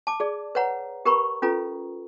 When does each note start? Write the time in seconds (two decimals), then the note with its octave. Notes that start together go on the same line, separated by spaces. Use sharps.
0.07 A5 D6
0.20 G#4 D5
0.55 B4 C#5 F#5 A#5
1.05 G4 A#4 B4 A#5 B5 C#6
1.42 C#4 F4 A4 B4 A#5